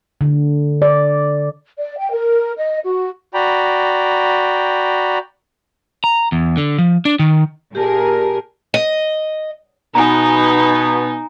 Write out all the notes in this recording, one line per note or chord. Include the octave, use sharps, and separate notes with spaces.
D3
D5
D5
G5
A#4
D#5
F#4
F#4 D5 G5 A#5 B5
A#5
E2
D3
F3
D4
D#3
A#2 G4 G#4 A#4 A5
D#5
B2 B3 D#4 G#5 A#5